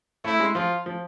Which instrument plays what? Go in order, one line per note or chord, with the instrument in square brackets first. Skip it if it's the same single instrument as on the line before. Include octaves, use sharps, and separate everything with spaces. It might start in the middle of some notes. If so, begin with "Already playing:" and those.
[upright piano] A3 [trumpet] E4
[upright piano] G#3
[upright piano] F3 [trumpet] F4
[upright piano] F3